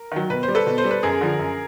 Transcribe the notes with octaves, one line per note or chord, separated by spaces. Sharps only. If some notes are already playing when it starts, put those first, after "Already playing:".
Already playing: A#4
D#3 F#3
B2 B4
C5
G3
A4 B4
B2
C5
G3
B4
F#2 G#4 A#4
D3 F3
F#2